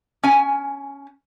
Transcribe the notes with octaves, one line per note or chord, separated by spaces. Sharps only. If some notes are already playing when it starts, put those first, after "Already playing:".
C#4 G#5